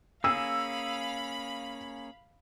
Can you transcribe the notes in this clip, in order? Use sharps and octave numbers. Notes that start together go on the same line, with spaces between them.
A#3 C#4 G#4 F5 B5 E6